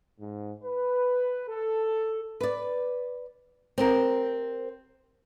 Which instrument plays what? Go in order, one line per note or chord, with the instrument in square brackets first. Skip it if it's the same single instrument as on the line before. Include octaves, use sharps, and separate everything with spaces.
[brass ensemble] G#2
B4
A4
[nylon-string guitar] B4 D5
C4 G4 A#4